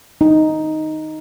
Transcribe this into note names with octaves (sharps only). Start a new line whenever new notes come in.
D#4